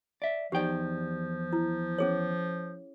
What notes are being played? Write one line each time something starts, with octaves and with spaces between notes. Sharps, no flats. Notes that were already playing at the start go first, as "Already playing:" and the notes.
D5 E5
E2 F3 D#4 G4 D5 G5
E4
C#4 G#4 C#5